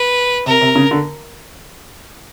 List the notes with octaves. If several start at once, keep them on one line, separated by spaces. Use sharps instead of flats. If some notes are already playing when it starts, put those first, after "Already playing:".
Already playing: B4
C3 A#4
C3
C#3
D3